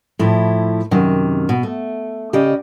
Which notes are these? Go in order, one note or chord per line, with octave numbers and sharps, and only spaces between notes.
A2 F3 E4
F#2 C3 D#3
B2
A3
C#3 G4 D5 D#5